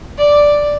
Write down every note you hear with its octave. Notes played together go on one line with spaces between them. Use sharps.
D5